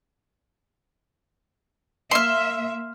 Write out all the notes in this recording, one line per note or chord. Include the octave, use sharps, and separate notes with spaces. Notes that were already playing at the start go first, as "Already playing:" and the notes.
A#3 E5 C6 F6